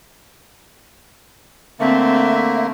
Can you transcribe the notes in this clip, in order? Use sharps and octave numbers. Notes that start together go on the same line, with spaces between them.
D3 A3 A#3 C4 E5